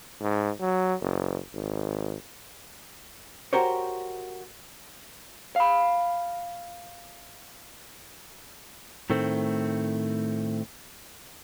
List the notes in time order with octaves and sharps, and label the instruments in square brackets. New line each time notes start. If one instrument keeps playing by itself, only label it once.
[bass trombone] G#2
F#3
F#1
G#1
[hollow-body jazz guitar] F#4 G4 A#4 C5 C#5
[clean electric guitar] F5 B5
A2 D#3 A3 C4